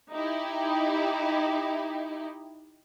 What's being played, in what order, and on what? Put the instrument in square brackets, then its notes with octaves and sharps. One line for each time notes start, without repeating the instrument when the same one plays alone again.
[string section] D#4 E4 G4